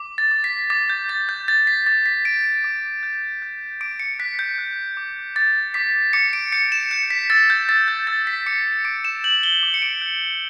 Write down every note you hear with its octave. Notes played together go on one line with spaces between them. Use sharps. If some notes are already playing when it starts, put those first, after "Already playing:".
Already playing: D6
A6
D6
B6
D6 A6
G6
D6 A6
G6
G6 A6
B6
D6 A6
B6
G6 D7
D6
G6
G6
D6 D7
C#7
F#6 B6
G6
F#6
D6
D6 A6
D6 B6
D6 C#7
D7
G6 C#7
E7
G6 C#7
B6
E6 A6
G6
E6 A6
G6
E6 A6
B6
D6 C#7
D6 D7
E7
G6 F#7
G7
D6
C#7
D7
G6